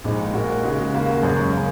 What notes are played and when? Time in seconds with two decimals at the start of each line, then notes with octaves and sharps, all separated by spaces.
0.04 A#1 A#2 G#3 D#4
0.34 A#2 G#3 D#4 F#4 A#4
0.64 C#3 G#3 F#4
0.94 D#2 C#3 A#3 F#4
1.23 F#2 C#3 G#3 C#4 G#4
1.53 C#3 A#3